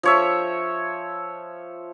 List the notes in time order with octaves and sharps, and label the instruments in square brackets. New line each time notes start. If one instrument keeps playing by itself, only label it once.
[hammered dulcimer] F3 C#5 E5